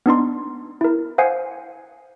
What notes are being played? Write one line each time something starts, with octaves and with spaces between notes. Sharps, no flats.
B3 D4 D#4 C6
E4 A#4
C5 F5 F#5 G#5 D#6 C7